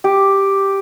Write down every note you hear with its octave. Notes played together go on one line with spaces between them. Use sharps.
G4